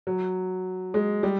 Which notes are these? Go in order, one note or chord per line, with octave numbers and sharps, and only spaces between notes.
F#3
G#3
G3